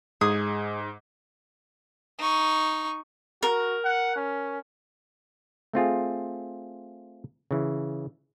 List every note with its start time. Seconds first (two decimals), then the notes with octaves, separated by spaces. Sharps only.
0.21 G#2 G#4 D#6
2.18 D#4 C#6
3.43 F#4 A#4
3.84 F#5
4.16 C#4
5.73 A3 C4 F4 G#4
7.51 C#3 E3